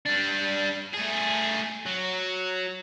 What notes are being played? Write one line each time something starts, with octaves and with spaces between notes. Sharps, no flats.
G3 D4
A3 G#4
F#3